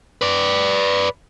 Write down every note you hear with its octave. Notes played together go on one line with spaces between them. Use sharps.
B4 D5